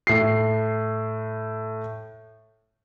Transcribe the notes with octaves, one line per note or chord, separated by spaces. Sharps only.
A2 C7